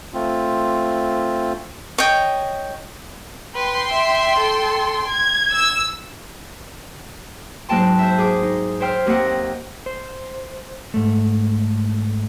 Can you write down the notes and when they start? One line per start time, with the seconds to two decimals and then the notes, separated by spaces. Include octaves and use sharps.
0.14 A3 C4 F4
1.98 C#5 D#5 G5
3.55 B4 G5 C6
3.91 E5
4.38 A4
5.07 G#6
5.52 E6
7.69 G#2 F#3 A#3 G5 A5 C6
7.99 C5 E5
8.18 G#4 D6 D#6
8.43 D#4
8.80 C5 C#5 E5 G5 C6 F6
9.06 D#2 A#3 C4 D#5 F#5
9.86 C5
10.94 G#2 A3